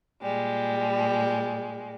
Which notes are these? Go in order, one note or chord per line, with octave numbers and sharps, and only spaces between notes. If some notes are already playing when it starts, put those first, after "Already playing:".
A#2 G3 G#3